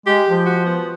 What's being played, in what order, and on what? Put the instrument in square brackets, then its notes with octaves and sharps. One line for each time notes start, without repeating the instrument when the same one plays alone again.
[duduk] G#3 [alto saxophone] G4
[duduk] F3
[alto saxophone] F#4
B3